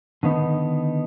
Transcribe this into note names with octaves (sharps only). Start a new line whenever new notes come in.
D3 D#3 B3 D#4